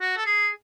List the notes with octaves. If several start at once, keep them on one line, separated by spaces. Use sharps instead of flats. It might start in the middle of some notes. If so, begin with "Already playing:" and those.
F#4
A4
G#4